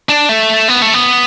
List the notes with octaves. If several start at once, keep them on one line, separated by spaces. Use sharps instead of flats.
D4
A3
B3
A3
B3